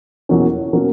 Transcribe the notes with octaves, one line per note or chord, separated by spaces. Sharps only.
E2 B2 F#3 A#3 C#4
B2 F#3 A#3 C#4